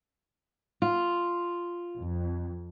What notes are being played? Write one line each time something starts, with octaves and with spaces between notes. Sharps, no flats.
F4
F2